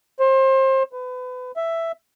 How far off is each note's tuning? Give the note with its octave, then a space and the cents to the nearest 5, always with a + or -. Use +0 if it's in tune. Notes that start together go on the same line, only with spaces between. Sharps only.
C5 +30
B4 +30
E5 +5